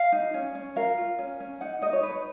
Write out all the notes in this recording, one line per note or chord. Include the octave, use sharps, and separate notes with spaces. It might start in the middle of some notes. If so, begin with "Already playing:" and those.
Already playing: F5
D#4
C#4
C#4
A#4 F5
F4
C#4
C#4
D#4 F#5
D#4 D#5
C#5
D#4 B4